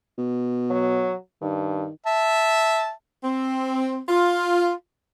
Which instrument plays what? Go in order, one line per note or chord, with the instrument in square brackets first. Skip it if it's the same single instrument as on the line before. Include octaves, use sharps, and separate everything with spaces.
[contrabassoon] B2
[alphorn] F#3
[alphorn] G2 [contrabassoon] D#3
[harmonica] E5 A5
[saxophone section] C4
F4